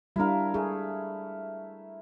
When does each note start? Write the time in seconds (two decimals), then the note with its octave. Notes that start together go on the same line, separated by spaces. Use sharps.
0.16 G3 D4 E4 A#4 F5
0.54 A3 G#4